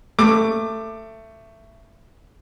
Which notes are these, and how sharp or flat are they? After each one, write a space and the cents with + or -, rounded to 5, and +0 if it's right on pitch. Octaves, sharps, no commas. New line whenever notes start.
A3 +15 D6 +15